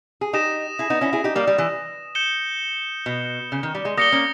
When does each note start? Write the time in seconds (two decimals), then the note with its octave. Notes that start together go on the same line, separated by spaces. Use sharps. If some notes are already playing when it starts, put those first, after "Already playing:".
0.21 G#4
0.33 D#4 G4 D#6 A#6 E7
0.79 E4 G#4
0.90 B3 D#4
1.01 C#4 E4
1.13 E4 G#4
1.24 D#4 G4
1.35 G3 A#3
1.47 G3
1.58 E3
2.15 G6 C#7 E7 G7
3.06 B2
3.52 C#3
3.63 D#3
3.75 G3
3.85 G#3
3.97 G3 A#3 D#6 A#6 C#7 G7
4.12 A#3 C#4